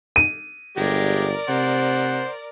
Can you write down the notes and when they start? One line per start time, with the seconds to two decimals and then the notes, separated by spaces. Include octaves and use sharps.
0.16 D#7
0.77 G1 G#3 G4 A#4 D5
1.49 C3 C5 F#5